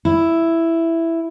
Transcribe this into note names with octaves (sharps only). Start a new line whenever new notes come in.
E4